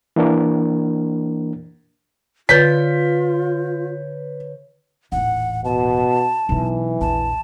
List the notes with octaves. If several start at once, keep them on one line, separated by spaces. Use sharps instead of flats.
E3 A#3 D4 A#4
D3 F4 B4 C#5 G6 A6 B6
D#1 A1 F#5
B2 A5
B1 E3 F#3
A#1 E2 A5